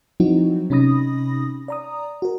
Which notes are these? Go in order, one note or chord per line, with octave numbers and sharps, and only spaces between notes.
F3 F#3 C4 D#4 E4 F#4
C3 C#4 D#4 B5 D#6 A#6
D5 A#5 D#6
F#4 A#4